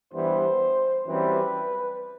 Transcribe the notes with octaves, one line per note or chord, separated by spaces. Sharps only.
G2 E3 G3 B3 C5
F#2 E3 G3 C4 B4